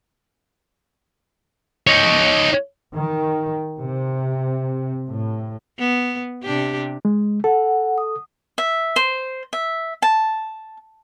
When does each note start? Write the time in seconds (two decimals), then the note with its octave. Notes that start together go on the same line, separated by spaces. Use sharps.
1.87 D#4 C#5
2.95 D#3
3.80 C3
5.08 A2
5.79 B3
6.43 C3 D4 G4
7.05 G#3
7.44 A4 F#5
7.98 D#6
8.58 E5
8.96 C5
9.53 E5
10.02 A5